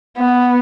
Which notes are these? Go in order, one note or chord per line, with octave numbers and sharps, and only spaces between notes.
B3